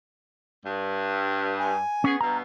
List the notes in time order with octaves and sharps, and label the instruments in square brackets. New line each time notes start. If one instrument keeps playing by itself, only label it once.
[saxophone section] G2
[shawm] G#5
[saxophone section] B3 G#4 [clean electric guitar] C#4
[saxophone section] G2 B2 [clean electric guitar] A#5